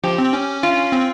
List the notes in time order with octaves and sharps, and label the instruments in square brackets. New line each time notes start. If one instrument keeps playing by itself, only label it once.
[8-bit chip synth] F3 [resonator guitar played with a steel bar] G4
[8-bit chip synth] C4
C#4
[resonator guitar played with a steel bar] F4
[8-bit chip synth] C4